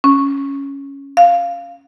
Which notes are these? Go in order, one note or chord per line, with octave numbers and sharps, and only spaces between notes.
C#4
F5